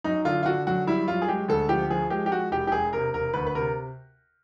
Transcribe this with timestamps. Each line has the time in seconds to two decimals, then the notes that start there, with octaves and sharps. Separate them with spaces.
0.04 F#2 D#4
0.25 D3 F4
0.43 F4
0.46 D3 F#4
0.67 F#2 F#4
0.87 G3 E4
1.08 F#2 F4
1.22 G#4
1.28 G#3 G4
1.49 D2 A4
1.69 F3 G4
1.90 F3 G#4
2.10 G#3 G4
2.26 G4
2.31 G#3 F#4
2.51 E1 G4
2.67 G4
2.72 E1 G#4
2.93 C3 A#4
3.14 E1 A#4
3.33 D2 B4
3.47 B4
3.55 C3 A#4